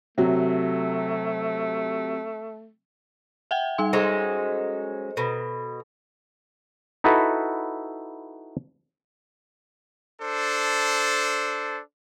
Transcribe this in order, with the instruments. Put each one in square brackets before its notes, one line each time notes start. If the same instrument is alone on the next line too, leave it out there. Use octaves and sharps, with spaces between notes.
[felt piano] C3 F#3 [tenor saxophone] A3
[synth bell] E5 F#5 G5
G3 D#4 C6
[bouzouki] F#3 G#3 C#4 [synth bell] A4 C5 D#5
[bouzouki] B2 [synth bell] A4
[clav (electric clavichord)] D#4 E4 F#4 A4 B4
[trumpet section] D4 A4 C5